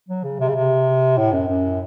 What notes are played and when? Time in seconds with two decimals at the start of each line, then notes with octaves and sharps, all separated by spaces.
0.09 F#3
0.24 C#3
0.40 C3
0.48 C#3
0.55 C3
1.18 A2
1.33 F#2
1.48 F#2